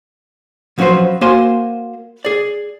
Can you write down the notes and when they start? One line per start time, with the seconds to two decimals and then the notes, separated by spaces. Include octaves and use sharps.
0.78 F3 F#3 C#4 F#4 B4 C5
1.21 A#3 F#4 A#4 C5 G#5 C6
2.25 G#4 D5